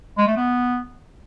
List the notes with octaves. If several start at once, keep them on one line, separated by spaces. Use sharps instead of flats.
G#3
A3
B3